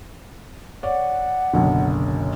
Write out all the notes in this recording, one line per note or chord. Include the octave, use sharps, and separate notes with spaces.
C#5 D5 F#5
F#1 B1 D3